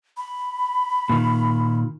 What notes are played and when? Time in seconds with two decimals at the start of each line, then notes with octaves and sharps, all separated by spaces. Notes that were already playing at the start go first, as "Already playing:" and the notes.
0.17 B5
1.09 A#2 D#3